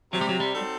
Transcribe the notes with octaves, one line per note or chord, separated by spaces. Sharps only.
C3 F#3
G3
F#3
G3
F#3 C4 D#4 A4